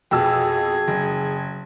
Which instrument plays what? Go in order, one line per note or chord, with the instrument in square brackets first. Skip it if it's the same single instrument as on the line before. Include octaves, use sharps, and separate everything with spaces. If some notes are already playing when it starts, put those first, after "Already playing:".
[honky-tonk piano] F2 B2 E6 [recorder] G#4 [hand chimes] G5 A5
[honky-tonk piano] F#1